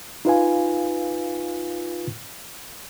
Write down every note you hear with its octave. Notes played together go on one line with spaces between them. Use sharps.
D#4 F4 B4 F5 G#5